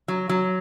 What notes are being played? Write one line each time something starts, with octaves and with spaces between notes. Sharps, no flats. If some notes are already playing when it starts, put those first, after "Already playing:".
F#3
F#3